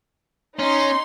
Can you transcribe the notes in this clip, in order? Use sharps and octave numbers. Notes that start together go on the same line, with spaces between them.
C#4 D#4 C6